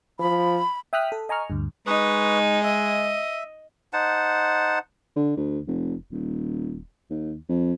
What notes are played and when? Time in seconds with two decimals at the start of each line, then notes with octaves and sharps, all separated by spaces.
0.20 F3 B5
0.93 E5 G5 D#6 F6 F#6 B6
1.12 A4
1.29 D#5 G#5 A#5 C#6 F6
1.50 D2 G2
1.87 G#3 D#4 B4 C#6 D#6
2.64 D#5 E5
3.93 D#4 C5 F#5 A5
5.16 D3
5.37 D2
5.67 F1
6.12 D#1
7.10 D#2
7.49 F2